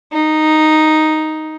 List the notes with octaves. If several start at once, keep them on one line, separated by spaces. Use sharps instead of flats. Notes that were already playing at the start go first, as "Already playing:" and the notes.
D#4